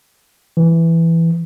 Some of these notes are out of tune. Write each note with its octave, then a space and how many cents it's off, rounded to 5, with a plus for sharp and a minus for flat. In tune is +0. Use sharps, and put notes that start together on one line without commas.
E3 +5